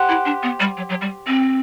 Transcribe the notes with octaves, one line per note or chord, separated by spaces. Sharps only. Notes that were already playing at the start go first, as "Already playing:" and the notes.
Already playing: G4 C5 F#5
E4
D4
B3
G3
F#3
F#3
G3
C4